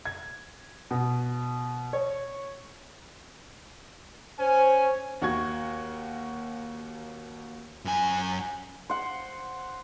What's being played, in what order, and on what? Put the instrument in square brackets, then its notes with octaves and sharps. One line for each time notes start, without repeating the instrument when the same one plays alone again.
[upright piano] G#6
B2
C#5
[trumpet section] C#4 G#5 [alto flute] C5
[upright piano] D#2 F#4 C#6 G#6
[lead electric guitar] F#2 G#5
[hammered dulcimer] C5 F#5